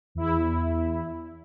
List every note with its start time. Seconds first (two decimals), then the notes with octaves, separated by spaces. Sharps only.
0.15 E2 E4